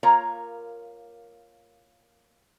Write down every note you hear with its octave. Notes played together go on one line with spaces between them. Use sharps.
A#3 F4 A#4 C#5 A#5